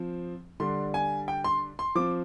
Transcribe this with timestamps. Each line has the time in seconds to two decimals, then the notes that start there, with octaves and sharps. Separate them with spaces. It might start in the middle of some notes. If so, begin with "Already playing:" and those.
Already playing: F3 C4
0.60 D3 G3 D4 C6
0.94 G#5
1.28 G5
1.44 C6
1.79 C6
1.95 F3 C4 D6